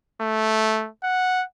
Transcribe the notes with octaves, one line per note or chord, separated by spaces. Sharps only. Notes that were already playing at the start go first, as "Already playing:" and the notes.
A3
F#5